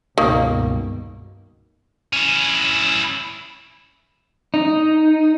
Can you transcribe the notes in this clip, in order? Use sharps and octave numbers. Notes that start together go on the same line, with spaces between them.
C#2 G2 B2 D#3 A#3
C#4 E4
D#4